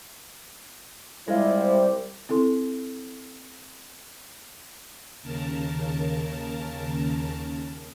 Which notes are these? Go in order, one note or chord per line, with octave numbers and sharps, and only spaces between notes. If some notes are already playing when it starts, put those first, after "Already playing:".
C2 G3 G#3 E4 F4 C5
C4 E4 A4 C6
D#2 C#3 A#4 A5